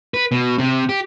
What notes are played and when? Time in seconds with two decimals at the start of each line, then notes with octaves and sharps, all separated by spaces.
0.14 B4
0.32 B2
0.59 C3
0.89 G4